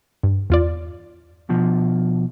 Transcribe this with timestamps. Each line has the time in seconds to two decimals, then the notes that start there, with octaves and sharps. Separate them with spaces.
0.23 G2
0.50 E2 F4 D5
1.49 B2 F3